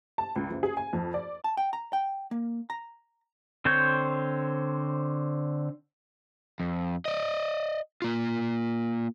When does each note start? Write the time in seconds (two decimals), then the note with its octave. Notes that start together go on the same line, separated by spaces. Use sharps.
0.18 A5
0.36 C#2
0.51 F#1
0.63 G#4
0.77 G#5
0.93 F2
1.14 D5
1.44 A5
1.57 G5
1.73 A#5
1.93 G5
2.31 A#3
2.70 A#5
3.65 D3 C4 C5 C#5 G6
6.60 F2
7.05 D5 D#5
8.02 A#3 F4